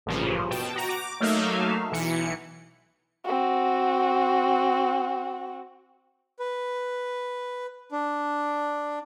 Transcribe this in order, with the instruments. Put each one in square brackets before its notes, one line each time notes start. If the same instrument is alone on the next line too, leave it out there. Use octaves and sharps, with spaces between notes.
[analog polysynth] A1 G2 A#2 C#3 F3
B2 G5 A5
F#4 A#5
D6
F#3 A3 A#3 D#4 E5 F5
B1 E3 C#7
[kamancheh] C4 F#4
[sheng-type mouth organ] B4
D4